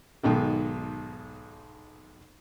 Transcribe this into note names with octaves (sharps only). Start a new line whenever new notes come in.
B1 G#2 B2 D#3